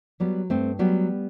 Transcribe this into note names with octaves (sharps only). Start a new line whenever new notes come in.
F#3 G3 B3
G2 A3 C4
F#3 G3 B3